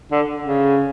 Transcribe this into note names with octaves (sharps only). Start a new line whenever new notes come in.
D3
C#3